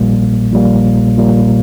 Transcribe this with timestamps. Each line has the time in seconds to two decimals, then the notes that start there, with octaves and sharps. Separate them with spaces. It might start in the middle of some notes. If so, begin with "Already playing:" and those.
Already playing: A#1 A#2 G3 A#3
0.51 A#1 A#2 G3 A#3
1.16 A#1 A#2 G3 A#3